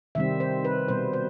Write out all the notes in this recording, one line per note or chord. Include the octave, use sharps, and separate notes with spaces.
C3 D#3 G3 C4 E5
C5
B4
B2 G3 B3 C5
C5